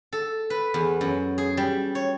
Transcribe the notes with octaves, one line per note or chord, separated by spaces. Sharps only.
A4
B4
E2
F#2
G#4
G3
C#5